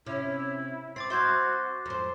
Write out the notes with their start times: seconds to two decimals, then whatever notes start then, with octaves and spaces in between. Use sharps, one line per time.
0.06 C3 C#4 E4
0.96 C4 D6 A6 C7
1.10 C4 F#4 E5 C6 G6 G#6
1.86 F2 C5